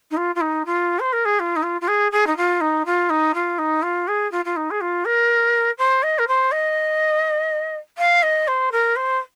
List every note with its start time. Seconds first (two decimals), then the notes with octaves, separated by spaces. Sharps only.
0.11 D#4
0.17 F4
0.35 F4
0.41 D#4
0.65 F4
0.99 C5
1.13 A#4
1.25 G#4
1.39 F4
1.56 D#4
1.63 F4
1.81 F4
1.88 G#4
2.12 G#4
2.27 D#4
2.37 F4
2.61 D#4
2.86 F4
3.10 D#4
3.34 F4
3.58 D#4
3.82 F4
4.08 G#4
4.31 F4
4.45 F4
4.56 D#4
4.70 G#4
4.81 F4
5.05 A#4
5.78 C5
6.03 D#5
6.18 A#4
6.27 C5
6.52 D#5
7.98 F5
8.22 D#5
8.47 C5
8.72 A#4
8.96 C5